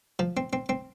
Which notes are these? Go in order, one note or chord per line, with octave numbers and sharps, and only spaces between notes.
F3
C4
C4
C4